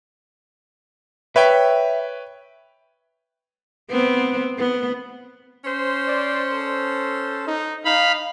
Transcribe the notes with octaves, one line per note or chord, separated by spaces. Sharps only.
B4 C#5 E5 G5
B3 C4
B3
C#4 C5
D5
A4
D#4
D#4 F5 B5